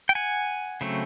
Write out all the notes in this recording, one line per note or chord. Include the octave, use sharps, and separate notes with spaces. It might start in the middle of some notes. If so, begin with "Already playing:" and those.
G5
F#5 G#5
C#3 F#3 A3 C4